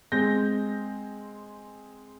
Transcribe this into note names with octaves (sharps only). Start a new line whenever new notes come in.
G#3 C4 G#4 G6 A#6